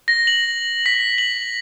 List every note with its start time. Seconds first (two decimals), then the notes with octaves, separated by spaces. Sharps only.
0.08 A#6
0.27 F#7
0.86 B6
1.18 F#7